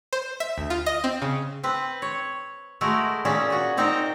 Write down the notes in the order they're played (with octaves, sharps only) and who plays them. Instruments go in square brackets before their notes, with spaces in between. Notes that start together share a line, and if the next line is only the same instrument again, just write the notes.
[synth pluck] C5
E5
D2
F4
D#5
C4
C#3
[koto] C4 B4
C#5
G#3 A3 E4 F#4 A#4
A#2 A#3 C#4 G#4 E5
F#4 G#4
A#2 C4 D#4 A#4 C5 G5